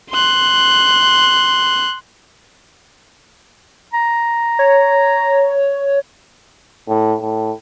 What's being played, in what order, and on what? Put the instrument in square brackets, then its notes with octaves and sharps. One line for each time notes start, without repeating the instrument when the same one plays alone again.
[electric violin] C6 F#6
[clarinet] A#5
[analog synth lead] C#5
[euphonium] A2
A2